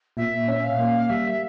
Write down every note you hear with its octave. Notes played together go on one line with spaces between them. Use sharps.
A#2 E5
C#4
F5
A#3
G3 E5